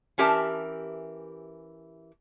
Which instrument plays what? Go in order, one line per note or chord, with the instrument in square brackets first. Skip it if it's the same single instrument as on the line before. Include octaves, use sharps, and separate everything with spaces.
[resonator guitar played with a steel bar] E3 C#4 G4 A#4 E5 A5